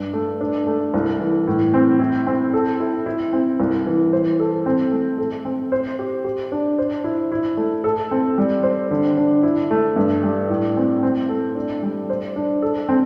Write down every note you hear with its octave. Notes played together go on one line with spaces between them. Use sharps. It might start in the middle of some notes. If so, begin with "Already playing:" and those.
Already playing: G2
A3
D4
A3
C2
E3
A2
C4
E4
C4
A4
E4
E4
C4
C2
E3
C5
A4
C4
A3
A4
C4
C5
G4
G4
D4
C5
E4
E4
A3
A4
C4
G3
C5
D3
D4
E4
A3
G2
G3
A2
C4
C4
A3
D4
G3
C5
D4
A4
C4